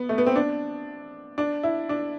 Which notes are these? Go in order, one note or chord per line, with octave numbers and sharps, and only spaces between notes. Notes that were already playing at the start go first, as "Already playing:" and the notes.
Already playing: B3
A3
B3
C4
D4
D4
E4
D4